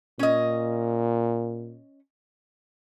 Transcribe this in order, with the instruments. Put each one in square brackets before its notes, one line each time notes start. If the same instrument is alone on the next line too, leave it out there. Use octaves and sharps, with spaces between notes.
[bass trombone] A#2 [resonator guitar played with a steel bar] C#4 D#5